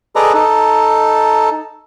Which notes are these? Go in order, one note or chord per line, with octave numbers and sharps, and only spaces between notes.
G#4 A4 B4 D5 D#5 A#5
D#4 A4